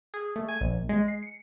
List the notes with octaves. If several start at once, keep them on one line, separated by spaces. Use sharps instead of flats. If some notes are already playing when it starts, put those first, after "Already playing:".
G#4
A3
G#5
A#1
G#3
C7
C#7